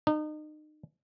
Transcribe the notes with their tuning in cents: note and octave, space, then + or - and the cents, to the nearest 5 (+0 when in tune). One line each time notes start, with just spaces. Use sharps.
D#4 -35